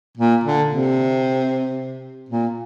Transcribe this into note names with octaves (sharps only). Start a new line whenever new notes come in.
A#2
D3
C3
A#2